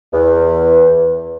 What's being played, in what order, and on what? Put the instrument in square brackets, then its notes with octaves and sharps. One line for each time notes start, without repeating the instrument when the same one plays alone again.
[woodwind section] E2